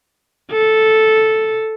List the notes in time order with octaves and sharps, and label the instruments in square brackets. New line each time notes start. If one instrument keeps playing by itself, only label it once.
[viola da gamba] A4